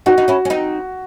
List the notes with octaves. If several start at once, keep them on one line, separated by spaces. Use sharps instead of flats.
C4 D#4 F#4
D#4
C#4 E4
C#4
C4 D#4